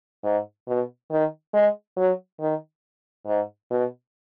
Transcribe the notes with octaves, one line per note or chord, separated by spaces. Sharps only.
G#2
B2
D#3
G#3
F#3
D#3
G#2
B2